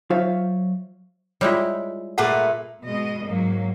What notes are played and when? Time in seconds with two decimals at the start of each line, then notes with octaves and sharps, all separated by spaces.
0.10 F#3 F4 C5 C#5 E5 F5
1.41 G3 G#3 E4 F4 C#5
2.18 A#2 A3 G#4 B4 F#5
2.85 B2 G#3 D#5
3.28 G#2 F#3 A#3